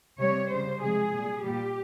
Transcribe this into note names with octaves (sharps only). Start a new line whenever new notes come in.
C3 G3 C#5
C#3 G3 C5
C3 F3 G#3 G#4
A#2 G3
A#2 G3 G4